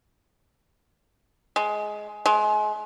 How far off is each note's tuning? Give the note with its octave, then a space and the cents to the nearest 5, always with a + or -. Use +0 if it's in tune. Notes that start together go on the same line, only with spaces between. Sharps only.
G#3 +15
G#3 +30